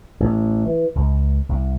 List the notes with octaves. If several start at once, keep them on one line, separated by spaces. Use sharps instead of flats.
A1
E3
C#2
C2